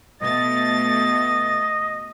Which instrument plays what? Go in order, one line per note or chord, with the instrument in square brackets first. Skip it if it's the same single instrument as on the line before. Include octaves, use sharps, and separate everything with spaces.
[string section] B2 A3 A6 [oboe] D#5